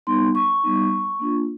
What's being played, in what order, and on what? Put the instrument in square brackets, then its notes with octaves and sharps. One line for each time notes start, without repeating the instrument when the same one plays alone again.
[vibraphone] G3 B3 D#4 C6
C#6
G3 B3 D#4
A#3 D4 F4